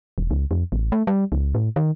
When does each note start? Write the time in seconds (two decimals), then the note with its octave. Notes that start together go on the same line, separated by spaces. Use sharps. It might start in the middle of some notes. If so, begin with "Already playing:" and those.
0.18 E1
0.31 C#2
0.51 F2
0.72 A1
0.92 A3
1.07 G3
1.32 C#2
1.55 A2
1.76 D#3